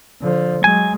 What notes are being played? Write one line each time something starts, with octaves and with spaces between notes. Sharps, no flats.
D3 F3
F#3 G#3 G#5